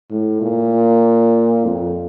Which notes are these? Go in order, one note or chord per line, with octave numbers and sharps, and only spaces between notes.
A2
A#2
F2